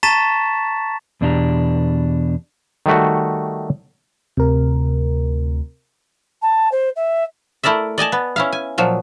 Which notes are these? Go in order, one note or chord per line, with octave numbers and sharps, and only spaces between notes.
A5 A#5 C#6 A6 B6 E7
E2 B2 D4 E4 G4 A#5
D#3 G3 A3 F#4
D2 C3 A#4
A5
C5
E5
A3 E4 A#4 D5 E5
D5 D#5 G#5 A5
B3
C#4 E4 F5
G#5
A#2 F3 F#3